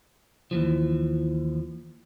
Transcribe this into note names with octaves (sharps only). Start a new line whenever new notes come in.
D#2 E3 F3